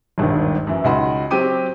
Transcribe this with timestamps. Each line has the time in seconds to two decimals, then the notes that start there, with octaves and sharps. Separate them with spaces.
0.18 D#1 G#1 G2 D#3
0.67 F#2 E3
0.84 C#2 D#4 F#4 B5 C6
1.31 F#3 C4 G4 G5 D6 D#7